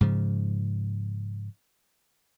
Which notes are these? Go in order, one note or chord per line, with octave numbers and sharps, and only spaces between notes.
G#2 C#3 F3